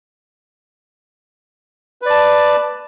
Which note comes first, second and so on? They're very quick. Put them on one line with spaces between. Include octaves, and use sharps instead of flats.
B4 D5 A5